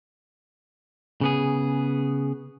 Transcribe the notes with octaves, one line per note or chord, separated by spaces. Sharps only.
C#3 B3 G#4